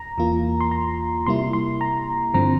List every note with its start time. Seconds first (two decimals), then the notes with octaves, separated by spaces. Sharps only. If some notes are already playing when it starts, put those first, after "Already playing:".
Already playing: A#5
0.18 E2 E3 A#3 F4
0.61 C6
0.71 A#5
1.26 C3 G3 A#3 E4 C6
1.53 C6
1.81 A#5
2.34 G2 D3 F3 C4 A#5